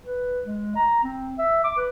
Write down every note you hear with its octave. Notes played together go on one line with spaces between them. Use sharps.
B4
G#3
A#5
C4
E5
D6
B4